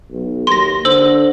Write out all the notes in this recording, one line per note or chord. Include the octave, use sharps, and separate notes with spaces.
B1
D#2 C6 A#6
D3 C5 E6 F#7